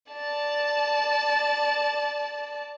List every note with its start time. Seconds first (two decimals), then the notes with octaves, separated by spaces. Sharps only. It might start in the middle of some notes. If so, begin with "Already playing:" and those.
0.13 D5 A5